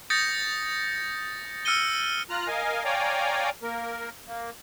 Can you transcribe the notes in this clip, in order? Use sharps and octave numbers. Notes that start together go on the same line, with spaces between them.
D#6 G6 A6 A#6 C#7
E6 F6 C#7 D#7 G7
F4 A#5 F6 F#6
A#4 D#5 F5 G#5
C#5 D5 F5 G5 G#5 A#5
A#3 A#4
A#3